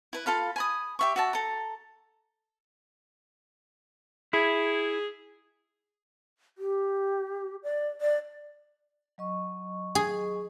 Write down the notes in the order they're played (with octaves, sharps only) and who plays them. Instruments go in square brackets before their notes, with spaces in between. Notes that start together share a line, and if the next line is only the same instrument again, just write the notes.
[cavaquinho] E4 B4
F4 A4 F5 B5
G#5 B5 D#6
G4 E5 C#6
F#4 E5 A5
A4 A#5
[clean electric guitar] E4 [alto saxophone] G#4
[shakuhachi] G4
D5
D5
[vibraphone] F#3 D#5 C#6
[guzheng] G#4